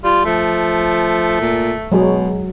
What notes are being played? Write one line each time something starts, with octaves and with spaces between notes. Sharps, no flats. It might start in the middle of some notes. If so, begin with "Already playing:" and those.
G3 F4
F3 A3
A#2
B2 F#3 G#3 G#4